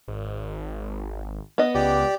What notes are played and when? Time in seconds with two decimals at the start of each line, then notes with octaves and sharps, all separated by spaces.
0.08 G#1
1.58 B3 D#5
1.75 C#2 G4 D5